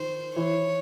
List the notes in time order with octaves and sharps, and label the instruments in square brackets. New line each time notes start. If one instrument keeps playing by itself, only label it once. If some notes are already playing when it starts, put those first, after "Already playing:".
Already playing: [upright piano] D#3 [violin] C5
[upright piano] E3 [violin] C#5